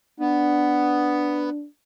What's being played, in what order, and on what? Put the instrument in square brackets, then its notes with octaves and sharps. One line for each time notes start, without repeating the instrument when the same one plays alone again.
[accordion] B3 [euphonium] D4